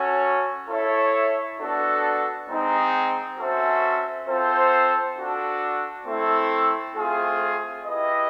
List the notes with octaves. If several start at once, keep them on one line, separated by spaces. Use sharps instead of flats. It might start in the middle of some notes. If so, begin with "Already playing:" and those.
Already playing: C#4 F#4 A4 C#5
E4 A4 C#5 E5
B3 D4 F#4 A4
G#3 C4 D#4
C#4 F#4 A4 C5 E5
C4 F4 A4 C5
D4 F#4 A4
A3 C4 E4 A4
A3 C4 F4 G#4
E4 G4 B4 D#5